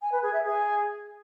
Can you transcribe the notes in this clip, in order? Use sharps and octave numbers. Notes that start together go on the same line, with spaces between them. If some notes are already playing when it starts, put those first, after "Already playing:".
G#5
B4
G#4
E5
G#4